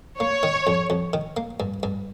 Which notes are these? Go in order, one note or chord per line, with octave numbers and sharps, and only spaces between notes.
A#3 C#5
D#3
F2
F2
D#3
A#3
G2
G2